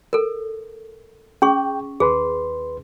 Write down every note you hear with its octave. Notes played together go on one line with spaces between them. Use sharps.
A4 A#4
C#4 G#4 G5 C#6
D#2 G#4 B4 C6